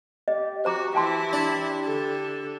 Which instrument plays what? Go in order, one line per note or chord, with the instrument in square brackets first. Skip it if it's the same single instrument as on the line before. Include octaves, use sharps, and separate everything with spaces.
[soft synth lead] G4 [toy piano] D#5
[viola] F#4 [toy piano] C5 A#5 D6
[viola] E3 E4 [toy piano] G5 A5 C6
[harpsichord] D4
[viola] D3 A4